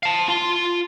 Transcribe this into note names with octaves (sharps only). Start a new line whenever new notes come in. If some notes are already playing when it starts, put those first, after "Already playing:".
F5 A5
F4 C6